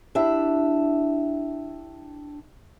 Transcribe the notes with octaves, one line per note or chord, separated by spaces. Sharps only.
D4 E4 G4 E5